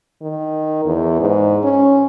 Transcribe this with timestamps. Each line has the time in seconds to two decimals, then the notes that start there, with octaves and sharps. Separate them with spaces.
0.22 D#3
0.85 E2
1.20 G#2
1.64 C#4